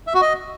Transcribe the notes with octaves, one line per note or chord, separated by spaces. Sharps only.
E5
F#4
D#5